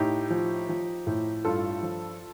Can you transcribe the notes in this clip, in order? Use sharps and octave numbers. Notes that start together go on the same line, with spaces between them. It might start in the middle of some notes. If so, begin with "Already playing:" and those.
Already playing: A2 D#4 G4
F3
F3
A2
G2 F4 A4
F3